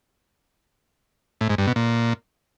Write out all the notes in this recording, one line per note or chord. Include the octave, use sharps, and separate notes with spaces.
A2
G#2
G2
B2
A#2